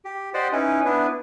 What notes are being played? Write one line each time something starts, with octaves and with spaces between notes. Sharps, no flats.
G4
G4 C5 D5 D#5 F#5
C#4 D#4 E4 B4
B3 D4 E4 B4